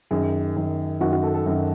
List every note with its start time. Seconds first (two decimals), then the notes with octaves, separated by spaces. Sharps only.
0.11 F#2 D#3 G#4
0.56 F#2 D#3
1.00 F#2 D#3 F#4
1.12 F#4
1.23 A4
1.34 A4
1.46 F#2 D#3